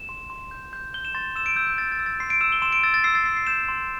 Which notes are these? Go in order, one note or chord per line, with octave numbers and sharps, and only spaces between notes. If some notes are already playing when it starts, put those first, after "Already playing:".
Already playing: E7
C6
C6
G6
G6
G6 G7
E7
C6 A6
E6 E7
D7
E6 G6
G6
G6 A6
A6
E6
A6
C6 C7
D7
E6 E7
G7
C6 E7
D7
E6 A6
A6
E6 C7
A6
C6 C7
C7
G6 E7
C6